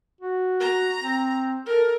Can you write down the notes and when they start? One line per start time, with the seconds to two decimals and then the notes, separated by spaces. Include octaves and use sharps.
0.21 F#4
0.60 A#5
1.02 C4
1.66 A4 A#4